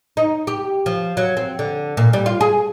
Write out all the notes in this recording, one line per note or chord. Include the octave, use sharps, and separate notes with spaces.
D#4
G4
F3
F#3
C4
D3
A#2
G3
F4
G#4